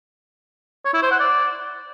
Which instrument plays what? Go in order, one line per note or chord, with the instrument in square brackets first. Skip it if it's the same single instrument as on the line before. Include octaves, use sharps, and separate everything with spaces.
[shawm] C#5
E4
C5
F#5
D5